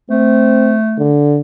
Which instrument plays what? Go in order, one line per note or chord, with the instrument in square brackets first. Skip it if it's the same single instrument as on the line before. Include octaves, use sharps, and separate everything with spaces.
[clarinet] A3 [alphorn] C4
[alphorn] D3